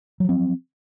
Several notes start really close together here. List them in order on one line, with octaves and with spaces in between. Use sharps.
F#3 F3 C4